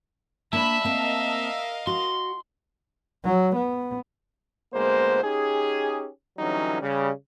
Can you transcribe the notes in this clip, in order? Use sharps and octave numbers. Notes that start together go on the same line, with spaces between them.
A#3 D4 E5 A5 B5
A#3 C4 A#4 D#5 F5
F#4 C6
F#3
B3
D2 G#3 A#3 B3 C5
C#4 D#4 G4 G#4
D3 E3 F#3 G3 C#4 D#4
C#3 G3